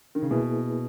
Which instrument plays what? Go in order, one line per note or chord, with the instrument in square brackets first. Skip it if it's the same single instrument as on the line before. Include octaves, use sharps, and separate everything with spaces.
[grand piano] D#3
C#3
[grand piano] B2 [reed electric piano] A#3 E4 G#4 B4